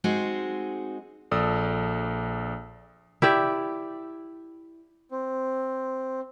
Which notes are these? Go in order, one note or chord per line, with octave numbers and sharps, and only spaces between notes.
G#3 C4 D#4 F#4
A#1 A4 D5 D#6 E6
E4 G4 D5 E5
C4